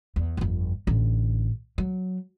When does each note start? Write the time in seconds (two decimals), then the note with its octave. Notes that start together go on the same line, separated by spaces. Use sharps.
0.16 E2
0.37 G1 F2
0.87 A1 D3
1.78 F#3